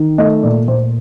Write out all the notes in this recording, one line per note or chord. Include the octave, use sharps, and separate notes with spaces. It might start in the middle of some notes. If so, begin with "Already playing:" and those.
Already playing: D#3
A3 D#5
A#2 D5
A#2 C5